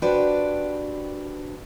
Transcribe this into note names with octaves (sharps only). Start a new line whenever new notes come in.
D4 F#4 G4 B4 C5 D5